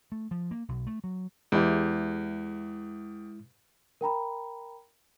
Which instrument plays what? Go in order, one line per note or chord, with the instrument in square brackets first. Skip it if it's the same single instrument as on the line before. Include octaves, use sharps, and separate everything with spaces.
[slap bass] A3
F3
A#3
B1
A3
F#3
[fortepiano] E2 G4 [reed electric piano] G#3 E4
[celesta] A#4 G5 A#5 B5